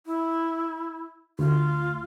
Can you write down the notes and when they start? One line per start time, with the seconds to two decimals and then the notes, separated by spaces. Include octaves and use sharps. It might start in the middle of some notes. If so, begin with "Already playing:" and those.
0.06 E4
1.39 D2 F4